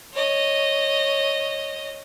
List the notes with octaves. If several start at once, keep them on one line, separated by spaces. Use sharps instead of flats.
C#5 D#5